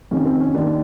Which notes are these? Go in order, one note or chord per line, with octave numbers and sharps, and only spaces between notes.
F2 C3 D#3 C#4
C4
C#4
D#2 D#3 D4